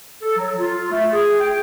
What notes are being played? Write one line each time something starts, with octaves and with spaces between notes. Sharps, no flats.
A4
F#3
F4
A3
G#4
G5